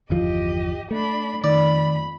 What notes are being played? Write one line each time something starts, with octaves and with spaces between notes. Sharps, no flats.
G1 E2 F3 G4 D#5
A3 D4 B5
F2 D#3 D5 B5